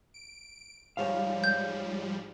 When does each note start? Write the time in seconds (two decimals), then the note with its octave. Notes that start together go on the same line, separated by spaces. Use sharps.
0.14 D7
0.97 G#2 F3 G3 C5 C#5 F5
1.44 G6